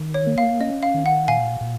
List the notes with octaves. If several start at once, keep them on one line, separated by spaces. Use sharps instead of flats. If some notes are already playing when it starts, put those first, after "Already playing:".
Already playing: D#3
C#5
A#3
F5
C#4 D#5
F5
D#3
F#5
A#2 F5 G#5
A#2